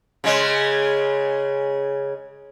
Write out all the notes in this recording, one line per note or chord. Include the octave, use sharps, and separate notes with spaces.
C#3 G#3